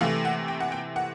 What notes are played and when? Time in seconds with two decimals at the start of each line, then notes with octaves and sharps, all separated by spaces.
0.01 C3 E3 A3 F5
0.25 F#5
0.48 G5
0.60 F#5
0.72 G5
0.96 F#5